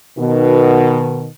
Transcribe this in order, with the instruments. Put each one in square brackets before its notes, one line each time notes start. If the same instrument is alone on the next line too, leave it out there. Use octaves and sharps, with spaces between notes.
[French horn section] B2 D#3